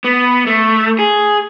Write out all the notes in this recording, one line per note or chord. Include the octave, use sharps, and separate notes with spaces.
B3
A3
G#4